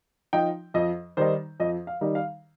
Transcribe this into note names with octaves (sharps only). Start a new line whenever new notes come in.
F3 D#4 G5
F2 D#5
D#3 G3 D#4 C5
F2 D#5
F5
D#3 G3 D#4
F5